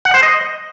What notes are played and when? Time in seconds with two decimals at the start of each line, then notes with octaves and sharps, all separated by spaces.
0.05 F#5
0.14 C5
0.23 D#5